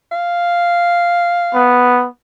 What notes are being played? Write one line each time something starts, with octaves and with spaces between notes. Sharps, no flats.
F5
B3